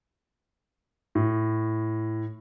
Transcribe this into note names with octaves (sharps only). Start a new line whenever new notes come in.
A2